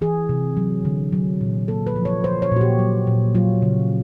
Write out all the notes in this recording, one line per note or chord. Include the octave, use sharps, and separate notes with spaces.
E3 G#4
C3
F#3
D3
F#3
A#2
A#3 A4
B4
F3
C#5
F3 C5
C#5
A#2 F#4
G4
F#3
A#2
F#3 F4
C#3